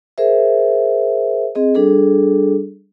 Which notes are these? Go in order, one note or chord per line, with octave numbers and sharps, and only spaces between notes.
G#4 A#4 C5 E5
C4 G#4 D#5
G3 D4 G#4 A4